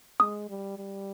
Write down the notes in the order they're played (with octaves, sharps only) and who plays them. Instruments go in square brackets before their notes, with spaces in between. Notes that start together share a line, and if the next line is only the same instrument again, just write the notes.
[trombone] G#3 [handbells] D#6
[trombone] G3
G3